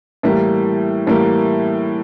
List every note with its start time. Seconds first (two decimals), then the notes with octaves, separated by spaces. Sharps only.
0.23 A2 E3 G3 A#3
1.07 A2 E3 G3 A#3